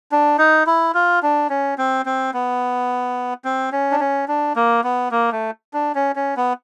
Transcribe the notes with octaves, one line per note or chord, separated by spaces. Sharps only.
D4
D#4
E4
F4
D4
C#4
C4
C4
B3
C4
C#4
D4
C#4
D4
A#3
B3
A#3
A3
D4
C#4
C#4
B3